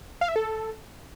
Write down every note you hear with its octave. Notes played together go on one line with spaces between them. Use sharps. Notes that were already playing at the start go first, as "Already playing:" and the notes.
F5
E5
A4